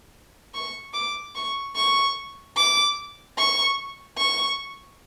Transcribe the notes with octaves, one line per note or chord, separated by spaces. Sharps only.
C#6
D6
C#6
C#6
D6
C#6
C#6